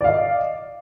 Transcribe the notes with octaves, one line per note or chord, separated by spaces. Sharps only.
D5 D#5 F5